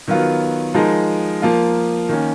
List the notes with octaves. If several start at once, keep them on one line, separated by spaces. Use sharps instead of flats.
D#3 F#3 B3 F4
F3 G#3 D#4 A#4
F3 A#3 F4
D#3 A#3 C#4